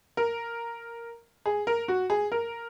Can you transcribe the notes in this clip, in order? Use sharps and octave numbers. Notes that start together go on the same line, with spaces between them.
A#4
G#4
A#4
F#4
G#4
A#4